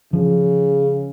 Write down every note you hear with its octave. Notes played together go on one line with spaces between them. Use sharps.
C#3 F3